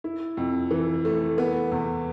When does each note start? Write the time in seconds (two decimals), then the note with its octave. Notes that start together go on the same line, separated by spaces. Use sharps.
0.04 E4
0.37 F2
0.71 E3
1.05 A3
1.38 B3
1.72 E2